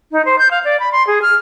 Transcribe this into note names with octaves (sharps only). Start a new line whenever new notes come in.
D#4
C5
G6
F5
D5
B5
C6
G#4
F6